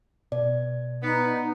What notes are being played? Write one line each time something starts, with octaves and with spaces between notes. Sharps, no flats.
B2 D5
B3 D#4